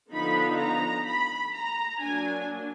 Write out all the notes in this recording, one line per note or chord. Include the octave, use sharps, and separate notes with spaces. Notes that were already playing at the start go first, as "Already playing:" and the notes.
D3 F3 B3 D#4 B5
A#5
B5
A#5
F#3 A#3 D4 G#5